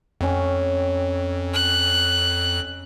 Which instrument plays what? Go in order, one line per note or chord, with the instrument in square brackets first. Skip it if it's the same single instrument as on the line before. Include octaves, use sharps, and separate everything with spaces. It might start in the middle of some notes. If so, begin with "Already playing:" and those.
[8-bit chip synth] F2 [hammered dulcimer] C#4 G5
[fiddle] F#6